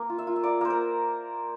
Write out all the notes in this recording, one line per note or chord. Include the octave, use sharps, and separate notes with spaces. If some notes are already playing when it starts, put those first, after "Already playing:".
Already playing: A#3
F4
E5
F4
E5
A#3 D5
A#3 C5
A#4